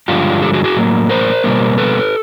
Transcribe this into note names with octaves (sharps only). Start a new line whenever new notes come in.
G2 D3 F3 G#3 F4 G4
G4 A4
F#4 G#4
F#4 G#4
A2 F#3 A#3
A#4 C5
B2 G3 A#3
A4 B4